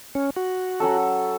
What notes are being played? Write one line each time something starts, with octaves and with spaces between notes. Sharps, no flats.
C#4
F#4
F#3 C#4 A4